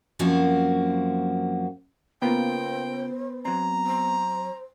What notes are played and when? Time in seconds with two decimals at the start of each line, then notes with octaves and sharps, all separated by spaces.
0.19 F#2 F3 A#3 C4 F#4
2.22 C#3 A#3 B3 F4 C5 G5
3.45 F#3 C4 A#5
3.86 C5